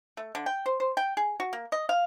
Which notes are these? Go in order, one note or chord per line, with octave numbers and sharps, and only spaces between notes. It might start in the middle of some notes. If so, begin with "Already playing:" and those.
A3
D3
G5
C5
C5
G5
G#4
F#4
A#3
D#5
F5